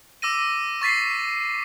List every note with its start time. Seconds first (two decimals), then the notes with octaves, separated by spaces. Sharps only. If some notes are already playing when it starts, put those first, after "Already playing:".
0.22 D6 E6 A#6 D#7
0.81 C#6 A6 B6 C7